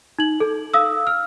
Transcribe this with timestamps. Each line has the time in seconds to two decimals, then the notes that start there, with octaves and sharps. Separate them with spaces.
0.19 D#4 F#7
0.40 A4
0.74 F5 D#6 E6
1.07 F6